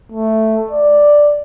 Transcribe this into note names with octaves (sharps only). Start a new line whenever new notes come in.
A3
D5